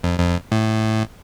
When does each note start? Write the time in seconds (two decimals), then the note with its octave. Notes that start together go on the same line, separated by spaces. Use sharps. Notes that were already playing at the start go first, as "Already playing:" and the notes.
0.03 F2
0.19 F2
0.52 A2